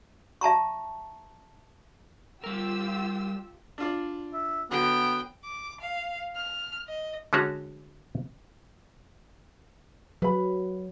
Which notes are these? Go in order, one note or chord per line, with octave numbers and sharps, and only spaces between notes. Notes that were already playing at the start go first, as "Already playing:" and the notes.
E5 A5 A#5 C#6
G3 F4 G4 A#4 E6
D4 F4 D5
E5
D3 F#3 B3 G5
D6
F5
F6
D#5
D3 G#3 C#4 F#4 C#5 F#5
F#3 B4 B5